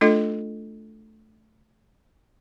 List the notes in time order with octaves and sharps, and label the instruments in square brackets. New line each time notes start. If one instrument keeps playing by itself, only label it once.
[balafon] A3 D4 F4 A4 D#5